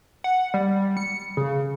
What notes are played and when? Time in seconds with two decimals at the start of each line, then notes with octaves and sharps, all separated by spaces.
0.24 F#5
0.54 G3
0.97 C#7
1.37 C#3